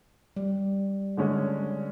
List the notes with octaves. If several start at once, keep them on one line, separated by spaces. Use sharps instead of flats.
G3
D3 G#3 C#4